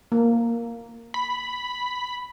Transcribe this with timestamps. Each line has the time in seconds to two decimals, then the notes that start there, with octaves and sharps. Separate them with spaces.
0.12 A#3
1.14 B5